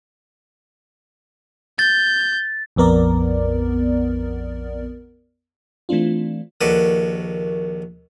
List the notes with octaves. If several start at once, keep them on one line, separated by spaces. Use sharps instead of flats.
G6 A6
A#1 F2 B3 A#4 D5
E3 A3 C4 D4 F4
A#1 D#2 F#4 A4 B4 D5